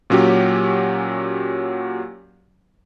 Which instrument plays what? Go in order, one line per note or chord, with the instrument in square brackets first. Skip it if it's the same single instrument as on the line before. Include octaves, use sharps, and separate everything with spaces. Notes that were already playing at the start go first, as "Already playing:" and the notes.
[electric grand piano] A#2 F#3 C#4 F#4 G4